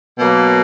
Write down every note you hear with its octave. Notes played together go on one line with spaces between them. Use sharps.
B2 F#3 A#3